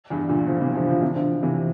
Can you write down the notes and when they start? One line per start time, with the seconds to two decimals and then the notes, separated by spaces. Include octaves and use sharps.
0.10 E2 G2
0.29 A#2 D3
0.47 D3 F3
0.61 C3 E3
0.75 D3 F3
0.88 D3 F3
1.01 C3 E3
1.15 D3 F3
1.43 C3 E3